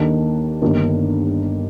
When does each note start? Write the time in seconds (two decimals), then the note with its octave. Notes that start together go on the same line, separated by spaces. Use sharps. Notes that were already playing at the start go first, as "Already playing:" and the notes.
Already playing: D#2 D#3 A#3 D4 A4
0.62 G1 G2 D#3 A#3